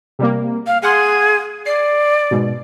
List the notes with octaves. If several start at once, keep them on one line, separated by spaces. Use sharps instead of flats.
C3 G3 A#3
F5
G#4 F5 F#5 C6
D5 C7
G#2 B2